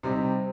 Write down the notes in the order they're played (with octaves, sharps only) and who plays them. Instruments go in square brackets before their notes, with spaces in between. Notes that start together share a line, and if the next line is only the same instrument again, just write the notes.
[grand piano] C3 G3 C4 D#4